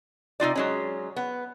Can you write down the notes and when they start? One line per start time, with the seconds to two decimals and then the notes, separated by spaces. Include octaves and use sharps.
0.40 C3 D#4 F4 D5
0.56 F#3 G#3 C#4
1.16 B3